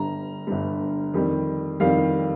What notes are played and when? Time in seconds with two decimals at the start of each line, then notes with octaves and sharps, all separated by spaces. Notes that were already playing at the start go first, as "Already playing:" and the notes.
Already playing: G1 G2 G3 A#5
0.47 G1 G2 G3
1.13 F2 D#3 G3
1.80 F2 D#3 G3 F5